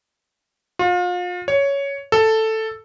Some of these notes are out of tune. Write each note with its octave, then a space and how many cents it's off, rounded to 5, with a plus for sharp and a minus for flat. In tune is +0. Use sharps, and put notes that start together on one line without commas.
F4 +35
C#5 +10
A4 +5